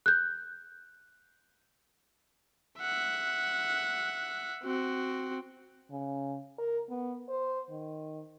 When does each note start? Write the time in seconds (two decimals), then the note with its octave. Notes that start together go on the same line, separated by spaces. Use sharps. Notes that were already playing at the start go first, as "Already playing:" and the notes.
0.06 F#6 G6
2.80 E5 F#5
4.63 C4 F#4
5.91 C#3
6.58 A#4
6.90 B3
7.29 C5
7.70 D#3